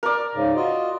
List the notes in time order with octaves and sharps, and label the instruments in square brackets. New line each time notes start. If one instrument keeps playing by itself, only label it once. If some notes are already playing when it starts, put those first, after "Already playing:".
[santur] A#4 D5
[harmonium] G#2 C#3
F4 F#4 D#5